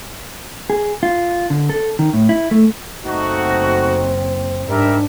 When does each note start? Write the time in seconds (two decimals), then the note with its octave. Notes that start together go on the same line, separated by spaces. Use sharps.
0.70 G#4
1.03 F4
1.50 D3
1.69 A4
1.99 D#3
2.14 A2
2.29 E4
2.51 A3
3.03 F#1 A3 C4 D#4 F#4
4.69 G#2 G3 D4 A#4 E5